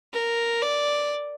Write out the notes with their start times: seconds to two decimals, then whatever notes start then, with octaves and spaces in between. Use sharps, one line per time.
0.14 A#4
0.62 D5